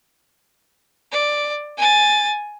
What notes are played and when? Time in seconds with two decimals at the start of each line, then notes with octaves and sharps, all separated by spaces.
1.12 D5
1.78 G#5 A6